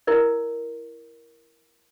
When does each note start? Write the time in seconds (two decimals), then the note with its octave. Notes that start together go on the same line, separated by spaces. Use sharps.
0.07 E4 A#4 D5